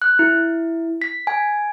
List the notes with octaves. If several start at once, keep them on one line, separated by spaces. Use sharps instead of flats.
F#6
E4
B6
G#5